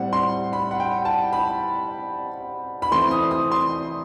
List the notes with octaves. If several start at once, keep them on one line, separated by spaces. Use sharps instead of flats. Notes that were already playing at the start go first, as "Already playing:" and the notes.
Already playing: A2 G3 C4 F#5
C6
B5
F#5
G5
A5
B5
B5
E3 A3 C4 C6
D#6
D#6
C6